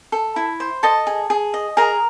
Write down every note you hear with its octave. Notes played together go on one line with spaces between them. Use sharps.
A4
E4
C5
A4 D#5 A5
G#4
G#4
D#5
G#4 A#4 A#5